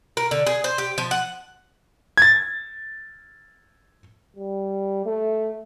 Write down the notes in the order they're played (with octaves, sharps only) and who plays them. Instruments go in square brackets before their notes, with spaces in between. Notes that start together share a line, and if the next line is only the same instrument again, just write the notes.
[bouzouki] A#4
D3
G#4
C5
G4
F3
F#5
[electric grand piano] G#6 A6
[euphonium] G3
A3